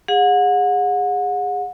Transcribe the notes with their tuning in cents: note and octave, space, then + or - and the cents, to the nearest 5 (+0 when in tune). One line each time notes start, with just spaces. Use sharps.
G#4 -25 F#5 -35